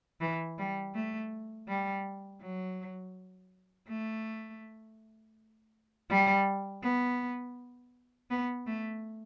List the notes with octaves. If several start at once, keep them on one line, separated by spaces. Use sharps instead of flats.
E3
G3
A3
G3
F#3
A3
G3
B3
B3
A3